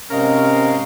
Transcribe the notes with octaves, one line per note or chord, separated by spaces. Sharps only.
G#2 C3 C#4 A#4 D#5 F5